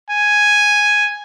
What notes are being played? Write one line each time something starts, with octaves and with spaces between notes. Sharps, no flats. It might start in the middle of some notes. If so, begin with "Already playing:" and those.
G#5